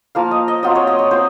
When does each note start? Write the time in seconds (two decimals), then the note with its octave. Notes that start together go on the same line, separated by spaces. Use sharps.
0.15 F3 A#3 F4 F5
0.31 D#5
0.48 D#5
0.63 F#3 C4 F4 D#5
0.75 C#5
0.87 D#5
0.99 C#5
1.11 C4 F4 C5